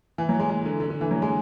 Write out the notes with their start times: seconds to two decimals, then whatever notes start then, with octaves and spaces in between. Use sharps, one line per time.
0.18 E3
0.29 F#3
0.40 G#3
0.50 G#3
0.66 D3
0.80 D3
0.90 D3
1.01 E3
1.11 F#3
1.22 G#3